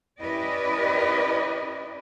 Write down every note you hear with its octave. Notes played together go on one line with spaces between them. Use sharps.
C#4 E4 G4 B4 D5 D#5